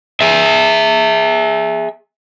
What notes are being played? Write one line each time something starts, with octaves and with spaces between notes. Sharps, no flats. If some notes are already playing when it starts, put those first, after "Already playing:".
G#4 E5